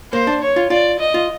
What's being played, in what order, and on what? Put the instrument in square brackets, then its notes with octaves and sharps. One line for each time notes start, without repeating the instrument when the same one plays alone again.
[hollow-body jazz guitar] A#3 [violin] C5
[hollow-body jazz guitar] D4
[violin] C#5
[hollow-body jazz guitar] F4
[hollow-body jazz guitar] F4 [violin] D5
[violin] D#5
[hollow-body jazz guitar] F4